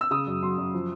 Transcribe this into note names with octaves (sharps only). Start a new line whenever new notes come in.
E6
C#3 D#6
F#2
F#3 C6
F#2
F3